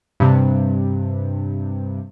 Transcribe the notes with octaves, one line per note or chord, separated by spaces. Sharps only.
G2 C3